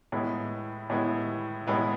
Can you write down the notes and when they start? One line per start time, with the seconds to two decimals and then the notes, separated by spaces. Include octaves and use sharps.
0.12 A2 G#3 B3 E4
0.90 A2 G#3 B3 E4
1.67 A2 G#3 B3 E4